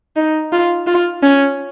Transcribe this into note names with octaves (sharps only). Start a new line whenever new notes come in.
D#4
F4
F4
C#4